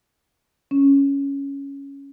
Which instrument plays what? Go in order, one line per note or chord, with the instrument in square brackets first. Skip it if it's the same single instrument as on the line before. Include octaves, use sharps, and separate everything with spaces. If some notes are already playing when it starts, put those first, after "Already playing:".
[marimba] C#4